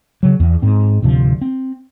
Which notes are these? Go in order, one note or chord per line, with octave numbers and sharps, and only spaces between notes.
C#3 F#3
E2
G#2 C4
D1 D2 C3 F3
C4